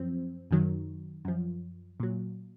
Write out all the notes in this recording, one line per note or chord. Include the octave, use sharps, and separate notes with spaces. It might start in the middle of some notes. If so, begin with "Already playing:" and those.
Already playing: F#2 F3 C4
F#2 D#3 F#3
F#2 F3
A#2 F#3